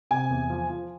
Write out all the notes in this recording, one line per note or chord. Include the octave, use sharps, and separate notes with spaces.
C3 G#5
E2
F3
F3